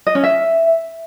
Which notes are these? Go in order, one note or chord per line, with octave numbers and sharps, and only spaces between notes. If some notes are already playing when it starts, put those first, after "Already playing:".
D#5
C#4
E5